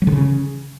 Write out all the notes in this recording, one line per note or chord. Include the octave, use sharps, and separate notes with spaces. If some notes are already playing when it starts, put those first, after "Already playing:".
F#3
D3
C#3